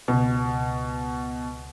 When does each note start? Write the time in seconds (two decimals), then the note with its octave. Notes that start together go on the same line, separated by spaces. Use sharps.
0.08 C#2 B2